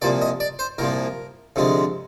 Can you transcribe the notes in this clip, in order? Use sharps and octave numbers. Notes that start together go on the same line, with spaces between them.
C2 A#2 F3 D5
D#5
D5
C5
C2 A#2 F3 A#4
D2 C3 F3 G#3